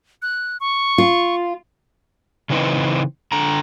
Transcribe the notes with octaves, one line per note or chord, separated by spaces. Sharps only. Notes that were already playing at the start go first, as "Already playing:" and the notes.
F#6
C#6
F4
C#3 E3 C4 D#4 B4 D#5
D3 A#5